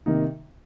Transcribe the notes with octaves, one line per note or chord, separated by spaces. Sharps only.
C3 D#3 A#3 D#4